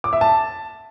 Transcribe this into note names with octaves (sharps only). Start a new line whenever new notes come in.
D6
E5
A5